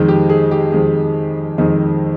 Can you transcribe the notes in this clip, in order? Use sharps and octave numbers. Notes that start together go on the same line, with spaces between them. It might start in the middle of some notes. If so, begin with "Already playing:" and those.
Already playing: F2 D#3 G#3
G4
G#4
G4
F2 D#3 G#3
F2 D#3 G#3